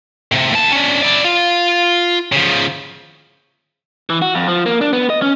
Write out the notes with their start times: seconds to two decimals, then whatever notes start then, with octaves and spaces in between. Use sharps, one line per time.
0.32 A2 C3
0.52 D#2 A5
0.72 C#4 D4
1.03 E4 D5
1.24 F4
2.32 C#3 F3
4.10 E3
4.22 F#4
4.35 F2
4.48 F3
4.66 A#3
4.81 D4
4.93 B3
5.10 D#5
5.22 C#4